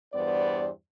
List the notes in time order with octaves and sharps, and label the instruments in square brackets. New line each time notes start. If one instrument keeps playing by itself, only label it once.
[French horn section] E2 G2 B3 C5 D5